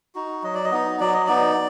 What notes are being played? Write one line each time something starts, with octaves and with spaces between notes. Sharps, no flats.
D#4 F#4
F#3 D#5
D5
D#5
B3 D#4
F#3 D5
D#5
B3 D#4 D5